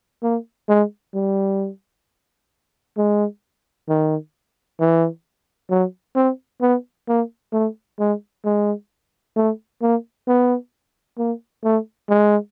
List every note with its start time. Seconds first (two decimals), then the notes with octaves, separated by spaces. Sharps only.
0.23 A#3
0.69 G#3
1.14 G3
2.97 G#3
3.88 D#3
4.80 E3
5.70 F#3
6.16 C4
6.61 B3
7.08 A#3
7.52 A3
7.99 G#3
8.45 G#3
9.36 A3
9.82 A#3
10.27 B3
11.18 A#3
11.64 A3
12.09 G#3